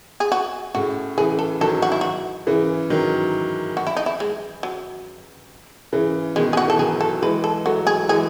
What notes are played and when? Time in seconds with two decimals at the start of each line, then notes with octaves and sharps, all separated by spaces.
0.20 G#4
0.32 F#4
0.74 A2 C#3 F#4
1.17 C#3 E3 G#4
1.39 A4
1.61 D#3 F#3 A4
1.82 F#4
1.92 E4
2.01 F#4
2.47 C#3 E3
2.90 D#3 F#3
3.77 F#4
3.87 E4
3.97 D#4
4.06 E4
4.20 G#3
4.63 F#3
5.93 C#3 E3
6.36 B2 D#3 G#3
6.53 G#4
6.57 F#4
6.68 E3 A4
6.79 D#3 F#3 G#4
7.01 A4
7.22 E3 G#3 B4
7.44 A4
7.66 F#3 A3 F#4
7.87 G#4
8.09 E3 G#3 G#4